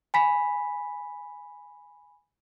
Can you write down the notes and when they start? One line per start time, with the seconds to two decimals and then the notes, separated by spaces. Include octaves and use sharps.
0.14 G#5 B5 B6